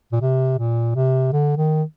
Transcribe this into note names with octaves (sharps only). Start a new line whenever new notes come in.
A#2
C3
A#2
C3
D3
D#3